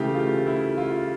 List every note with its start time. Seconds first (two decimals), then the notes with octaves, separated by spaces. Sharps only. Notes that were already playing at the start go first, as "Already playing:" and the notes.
Already playing: C#3 E3 A3 G4
0.15 F4
0.47 E4
0.78 F4